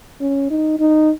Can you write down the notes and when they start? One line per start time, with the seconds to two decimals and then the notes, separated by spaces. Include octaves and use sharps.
0.21 C#4
0.51 D#4
0.79 D#4